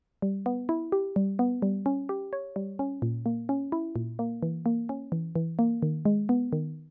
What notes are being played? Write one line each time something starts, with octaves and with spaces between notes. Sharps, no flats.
G3
B3
E4
G4
G3
B3
G3
C#4
G4
C#5
G3
C#4
A#2
A#3
C#4
E4
A#2
A#3
E3
A#3
C#4
E3
E3
A#3
D#3
G#3
B3
D#3